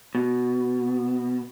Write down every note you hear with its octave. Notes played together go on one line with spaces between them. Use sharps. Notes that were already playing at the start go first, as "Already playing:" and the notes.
B2